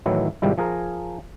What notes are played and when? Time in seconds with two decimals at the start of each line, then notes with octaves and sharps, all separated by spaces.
0.06 A2 D#3 E3 F#3 E4
0.42 G#2 C3 D#3 F3 G3 E4
0.58 F3 G#4 A#4 G#5 A#5